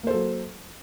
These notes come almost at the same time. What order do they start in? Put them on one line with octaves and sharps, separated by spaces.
A#3 C5 A4 F#3